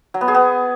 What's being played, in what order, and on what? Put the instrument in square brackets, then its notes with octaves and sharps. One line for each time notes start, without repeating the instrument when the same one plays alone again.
[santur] F#3
B3
G#4
B3